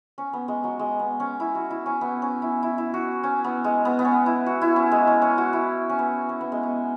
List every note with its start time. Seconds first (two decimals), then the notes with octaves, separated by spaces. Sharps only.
0.18 C#4
0.33 B3
0.48 G#3
0.64 F#3
0.79 G#3
0.99 B3
1.20 C#4
1.40 E4
1.55 F#4
1.71 E4
1.86 C#4
2.01 B3
2.22 C#4
2.42 E4
2.63 E4
2.78 E4
2.94 F#4
3.24 C#4
3.44 B3
3.64 G#3
3.85 B3
3.99 B3
4.05 C#4
4.26 E4
4.46 F#4
4.61 E4
4.76 C#4
4.92 G#3
5.07 C#4
5.22 C#4
5.38 F#4
5.53 E4
5.89 C#4
5.99 B3
6.29 C#4
6.41 B3
6.52 G#3
6.63 B3